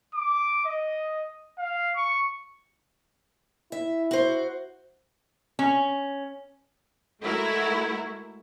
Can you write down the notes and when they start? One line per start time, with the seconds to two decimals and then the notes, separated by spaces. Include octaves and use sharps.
0.14 D6
0.65 D#5
1.58 F5
1.96 C#6
3.72 E4 E5
4.11 F#4 C5
5.59 C#4
7.22 G#3 A3 E4 F#4 A#4